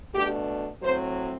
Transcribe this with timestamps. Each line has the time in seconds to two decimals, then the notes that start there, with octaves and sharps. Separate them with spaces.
0.14 B2 A3 D4 G4
0.81 A2 F#3 C4 C5